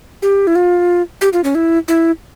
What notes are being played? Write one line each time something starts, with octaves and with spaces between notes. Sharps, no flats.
G4
E4
F4
G4
F4
C#4
E4
E4